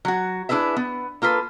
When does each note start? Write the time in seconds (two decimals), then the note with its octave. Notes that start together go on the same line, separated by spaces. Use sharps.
0.05 F#3 F#4
0.49 D4 E4 G#4 B4 E5
0.77 B3
1.22 A#3 F4 A4 B4